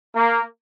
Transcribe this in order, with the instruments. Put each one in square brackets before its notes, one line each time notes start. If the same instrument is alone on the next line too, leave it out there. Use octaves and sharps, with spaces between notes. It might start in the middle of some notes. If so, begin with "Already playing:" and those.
[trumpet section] A#3